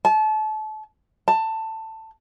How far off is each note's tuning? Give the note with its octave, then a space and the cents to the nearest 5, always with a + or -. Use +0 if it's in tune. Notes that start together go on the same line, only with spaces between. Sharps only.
A5 -30
A5 +15